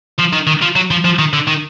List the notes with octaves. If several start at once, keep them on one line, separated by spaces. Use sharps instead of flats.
F3
D#3
D#3
F3
F#3
F3
F3
D#3
D3
D#3